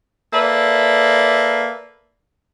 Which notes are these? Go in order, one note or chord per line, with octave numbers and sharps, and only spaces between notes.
A#3 A4 B4 D5 E5